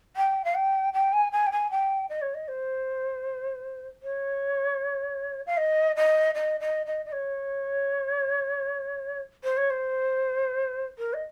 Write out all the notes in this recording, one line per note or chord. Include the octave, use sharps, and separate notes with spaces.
G5
F5
G5
G5
G#5
G#5
G5
G#5
G5
D#5
C#5
D#5
C5
C#5
F5
D#5
D#5
D#5
D#5
D#5
D#5
C#5
C5
C#5
C5
A#4
D#5